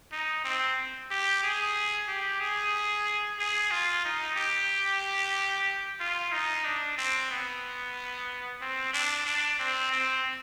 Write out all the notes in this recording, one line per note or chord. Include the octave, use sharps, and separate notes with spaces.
D#4
C4
G4
G#4
G4
G#4
G#4
F4
D#4
G4
F4
D#4
D4
C4
B3
C4
D4
D4
C4
C4